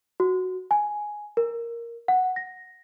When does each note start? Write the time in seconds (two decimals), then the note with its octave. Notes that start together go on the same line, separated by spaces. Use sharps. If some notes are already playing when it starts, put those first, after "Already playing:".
0.20 F#4
0.71 G#5
1.37 A#4
2.08 F#5
2.36 A#6